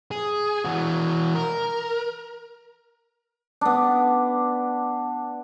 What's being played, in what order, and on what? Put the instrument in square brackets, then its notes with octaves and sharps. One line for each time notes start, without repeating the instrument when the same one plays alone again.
[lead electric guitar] G#4
E3 F#4
A#4
[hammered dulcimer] B3 D4